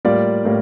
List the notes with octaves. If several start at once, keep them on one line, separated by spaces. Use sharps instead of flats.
A2 G3 A#3 F4 D5
A2 G3 A#3